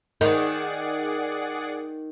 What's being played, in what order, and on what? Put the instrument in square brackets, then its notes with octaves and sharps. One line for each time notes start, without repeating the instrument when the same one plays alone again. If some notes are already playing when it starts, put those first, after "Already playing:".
[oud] D#3 D#4 [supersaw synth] G#4 D5 F#5 [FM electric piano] A#4